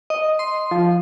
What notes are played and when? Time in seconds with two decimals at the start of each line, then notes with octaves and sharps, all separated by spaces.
0.10 D#5
0.39 C6
0.71 F3